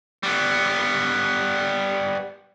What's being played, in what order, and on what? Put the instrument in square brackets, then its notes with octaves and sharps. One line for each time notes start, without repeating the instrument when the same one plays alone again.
[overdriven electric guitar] G3 B3